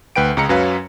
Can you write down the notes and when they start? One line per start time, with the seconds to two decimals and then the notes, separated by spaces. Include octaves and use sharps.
0.16 D2 B4 G5 D7
0.37 C#2 G#3 A#5 C#7
0.49 F#2 F#3 C#4 B4 F5